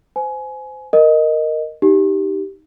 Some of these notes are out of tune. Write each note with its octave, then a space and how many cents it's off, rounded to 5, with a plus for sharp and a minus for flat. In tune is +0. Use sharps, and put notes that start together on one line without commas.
C5 -25 G#5 +20
A#4 +0 D#5 +0
D#4 +0 G4 -10